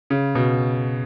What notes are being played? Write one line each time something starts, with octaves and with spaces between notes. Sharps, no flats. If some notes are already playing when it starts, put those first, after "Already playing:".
C#3
B2